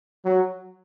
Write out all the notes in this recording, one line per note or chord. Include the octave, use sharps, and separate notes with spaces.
F#3